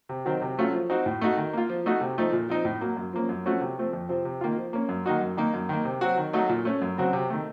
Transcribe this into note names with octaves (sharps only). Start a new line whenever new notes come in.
C3
D#3 F#3 C4
C3
F#3 A3 C#4 F4
F3
C4 D#4 F#4
A2
A3 D#4 F#4
D#3
A#3 F4
F3
A3 D#4 F#4
C3
F3 A3 D#4
A#2
F3 C4 D#4
A2
F#3 A#3
F#2
F3 A#3 C#4
F#2
F3 A3 C#4 F#4
C3
F3 A3 C4
F2
C3 F3 C4
C3
D#3 A#3 F4
F3
A#3 C#4
F#2
D#3 A#3 D#4 F#4
F#2
D#3 A#3 D#4
F#2
D#3 A#3
C3
F#3 C4 F#4
D#3
F#3 A3 D#4 F#4
A#2
A3 C#4
F#2
C#3 F#3 C4 F#4
C3
D#3 A3